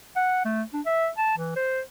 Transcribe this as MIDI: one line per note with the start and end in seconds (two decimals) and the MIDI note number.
0.16 0.41 78
0.45 0.62 57
0.73 0.81 62
0.86 1.08 76
1.18 1.37 81
1.38 1.55 52
1.56 1.81 72